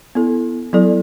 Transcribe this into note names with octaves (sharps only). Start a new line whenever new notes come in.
B3 E4 A4
F#3 B3 E4 A4 D5